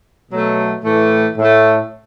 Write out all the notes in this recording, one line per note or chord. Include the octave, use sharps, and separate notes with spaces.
B2 F#3 A3
A2 E3 A3
A2 A3